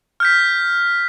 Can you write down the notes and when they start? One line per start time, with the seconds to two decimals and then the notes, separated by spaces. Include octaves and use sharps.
0.20 F6 G6 B6